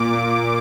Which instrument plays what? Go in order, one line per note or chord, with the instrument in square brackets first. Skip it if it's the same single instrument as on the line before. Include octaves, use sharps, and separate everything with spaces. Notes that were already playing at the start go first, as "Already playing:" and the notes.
Already playing: [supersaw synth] A#2 D6